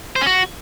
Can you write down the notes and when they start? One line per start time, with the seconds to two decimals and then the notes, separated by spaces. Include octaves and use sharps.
0.16 C5
0.21 C#4
0.26 F#4